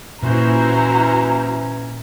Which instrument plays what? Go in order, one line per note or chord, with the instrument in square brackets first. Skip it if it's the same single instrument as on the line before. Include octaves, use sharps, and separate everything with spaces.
[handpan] A#2 [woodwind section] E3 C#4 [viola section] E4 F#4 C5 [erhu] A#5